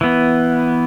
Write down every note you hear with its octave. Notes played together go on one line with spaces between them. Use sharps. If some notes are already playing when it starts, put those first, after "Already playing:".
E3 B3